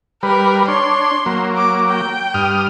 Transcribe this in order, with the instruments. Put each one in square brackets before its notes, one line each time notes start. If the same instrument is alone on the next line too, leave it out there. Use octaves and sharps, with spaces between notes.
[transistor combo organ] G3 B4 [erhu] A#4
[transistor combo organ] D4 C#5 [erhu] C6
[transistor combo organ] F#3 A#3
[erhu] D6
G5
[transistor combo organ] G2 D#6 F6